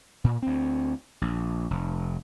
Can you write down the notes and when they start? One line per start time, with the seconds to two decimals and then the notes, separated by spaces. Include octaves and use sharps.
0.24 A#2
0.42 D2 C4
1.21 A#1
1.71 F1